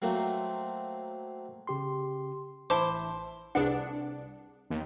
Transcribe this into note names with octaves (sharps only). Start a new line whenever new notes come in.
F#3 A3 A#3 C4 F4
C#3 G4 C6
A1 E4 C5 A5 D6
C2 D4 G#4 B4 F#5
D#2